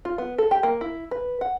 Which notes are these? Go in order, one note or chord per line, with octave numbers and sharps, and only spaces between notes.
F4
B3
A4
G4
A#3
E4
B4
F#5